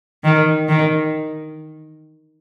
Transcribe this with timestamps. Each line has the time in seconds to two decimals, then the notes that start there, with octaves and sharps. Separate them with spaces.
0.24 D#3
0.68 D#3